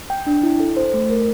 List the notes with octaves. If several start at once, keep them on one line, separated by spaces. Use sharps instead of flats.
G5
D4
E4
A4
C5
A3
A#4